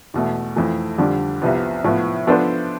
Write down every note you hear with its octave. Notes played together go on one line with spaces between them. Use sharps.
E2 B2 A3
F2 E3 A3
F2 D3 G3 D4
C2 C3 F3 B3
A2 F3 B3
F3 B3 D4 A4 C5